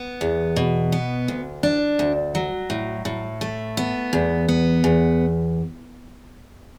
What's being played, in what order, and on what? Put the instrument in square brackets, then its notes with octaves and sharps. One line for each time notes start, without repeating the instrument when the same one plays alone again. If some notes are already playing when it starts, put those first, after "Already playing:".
Already playing: [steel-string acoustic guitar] B3
E2
B2
B3
D2
D4
D2
F#3
A2
A2
A3
B3
E2
B3
E2